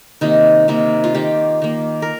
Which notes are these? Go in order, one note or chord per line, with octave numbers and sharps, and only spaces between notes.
C3 D#3 A#3 D#4
C3 D#3 A#3
F4
D#3 A#3 G4
D#3 A#3
A#4